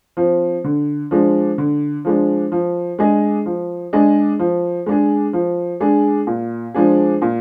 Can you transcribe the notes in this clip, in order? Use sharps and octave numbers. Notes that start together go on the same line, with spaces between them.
F3 C4
D3
F3 G#3 D4
D3
F3 G#3 D4
F3
G#3 D4 G#4 D#5
F3
G#3 D4 G#4 D#5
F3
G#3 D4 G#4
F3
G#3 D4 G#4
A#2
F3 G#3 D4 G#4
A#2